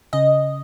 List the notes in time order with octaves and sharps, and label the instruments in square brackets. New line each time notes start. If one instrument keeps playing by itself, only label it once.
[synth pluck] C#3 D#5